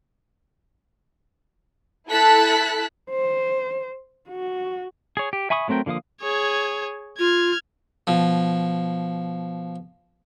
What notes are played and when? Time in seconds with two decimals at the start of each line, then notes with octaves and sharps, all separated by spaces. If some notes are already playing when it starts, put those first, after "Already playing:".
2.09 E4 A4 A5 F#6 B6
3.11 C5
4.29 F#4
5.17 G#4 C#5
5.33 G4
5.50 E5 G#5 B5 C#6 D#6
5.68 F#3 A3 C4 A#4 G5
5.86 D3 F3 A#3 F5 D#6
6.22 G#4 C#5
7.19 F4 F6 G#6
8.07 B2 F3